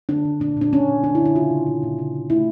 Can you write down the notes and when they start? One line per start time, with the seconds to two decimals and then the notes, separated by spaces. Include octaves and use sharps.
0.09 D3 D4
0.25 D3
0.40 A#2 D4
0.57 A#2 D4
0.72 A#2 C#4
0.88 A#2
1.04 D3 D4
1.15 E4
1.20 D3
1.25 E4
1.35 C#3 F4
1.51 C#3
1.67 A#2
1.83 A#2
1.98 C#3
2.14 C#3
2.30 A3 E4